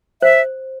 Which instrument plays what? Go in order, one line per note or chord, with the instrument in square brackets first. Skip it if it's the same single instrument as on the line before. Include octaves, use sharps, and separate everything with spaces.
[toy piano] C5 [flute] E5